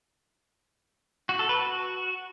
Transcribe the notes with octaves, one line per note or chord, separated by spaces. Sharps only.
F#4
A4
B4
F#4